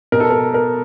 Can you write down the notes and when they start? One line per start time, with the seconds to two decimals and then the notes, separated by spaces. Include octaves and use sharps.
0.12 B2 A#4
0.20 A4
0.31 A#4
0.54 A#4